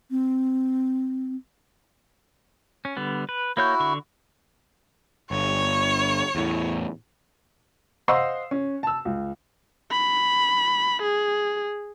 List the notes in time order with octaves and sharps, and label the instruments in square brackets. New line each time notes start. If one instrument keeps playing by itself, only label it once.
[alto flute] C4
[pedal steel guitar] C#4
D3 G3 B3
B4
[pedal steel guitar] A#3 C#5 G6 [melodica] E4 F#4
[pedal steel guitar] D3 C#6
[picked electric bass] G1 [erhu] C#5
[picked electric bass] E2 A2
[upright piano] C5 D#5 F5 F#5 C6 E6
C#4
A5 E6
C#2
[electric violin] B5
G#4